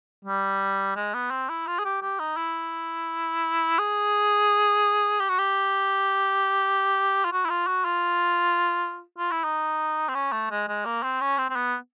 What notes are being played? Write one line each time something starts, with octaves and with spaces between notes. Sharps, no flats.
G3
G#3
B3
C4
E4
F4
G#4
G4
G4
D#4
E4
G#4
G4
F#4
G4
F4
F#4
E4
F4
F#4
F4
F4
E4
D#4
C4
C#4
A3
G#3
G#3
A#3
C4
C#4
C4
C4
B3